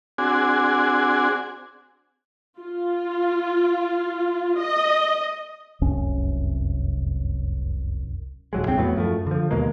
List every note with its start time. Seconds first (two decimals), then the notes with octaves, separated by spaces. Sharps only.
0.18 C4 D4 F#4 G#4 G#5
2.59 F4
4.59 D#5
5.81 F1 C2 F#2 C#4
8.53 D#1 F#3 G#3
8.66 C2 F2 C4
8.77 E2 A2 F#3 B3
8.96 F#2 F3 F#3 A3
9.27 D3 F3
9.51 D#2 B2 G#3 A#3